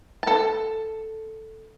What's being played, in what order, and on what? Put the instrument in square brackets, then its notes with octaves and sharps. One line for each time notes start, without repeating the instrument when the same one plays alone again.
[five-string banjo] A4 A5